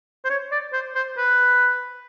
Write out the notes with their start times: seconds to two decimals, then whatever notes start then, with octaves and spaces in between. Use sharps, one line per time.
0.25 C5
0.30 C#5
0.51 D5
0.73 C5
0.95 C5
1.17 B4